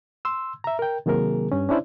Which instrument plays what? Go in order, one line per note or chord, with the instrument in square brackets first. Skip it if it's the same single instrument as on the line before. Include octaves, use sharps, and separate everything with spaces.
[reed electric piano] C6 E6
E5 A#5
A#4 G5
C3 D#3 F#3 A#3 G#4 A#4
G2 C#4
C#4 D4 E4 C5 D5